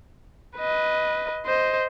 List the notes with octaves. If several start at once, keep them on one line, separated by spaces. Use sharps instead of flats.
B4 D#5
C5 D#5